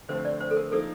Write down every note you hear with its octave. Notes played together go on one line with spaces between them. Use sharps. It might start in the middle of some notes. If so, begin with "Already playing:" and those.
D3 F3 A3 C4 C5
D5
C5
A4
A#4
F3 A#3 D#4 A4